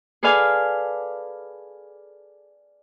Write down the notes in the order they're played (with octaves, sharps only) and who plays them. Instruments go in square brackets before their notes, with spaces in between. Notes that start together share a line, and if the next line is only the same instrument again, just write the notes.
[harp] G#4 A4 B4 D5 F5 G#5